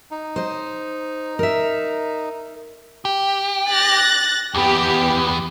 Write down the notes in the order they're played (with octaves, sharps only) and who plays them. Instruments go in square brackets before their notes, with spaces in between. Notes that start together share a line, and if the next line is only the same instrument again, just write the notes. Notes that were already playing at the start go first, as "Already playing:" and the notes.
[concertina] D#4
[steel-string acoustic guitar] C5 D#5
A#4 E5
[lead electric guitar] G4
[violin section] F#6 A6 A#6
[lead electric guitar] E2 B3 [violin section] G4